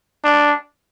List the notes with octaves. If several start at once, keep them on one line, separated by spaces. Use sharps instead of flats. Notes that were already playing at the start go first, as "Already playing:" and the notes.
D4